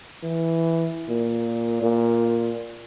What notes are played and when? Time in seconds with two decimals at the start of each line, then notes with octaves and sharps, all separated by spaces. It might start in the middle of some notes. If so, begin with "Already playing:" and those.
0.23 E3
1.09 A#2
1.82 A#2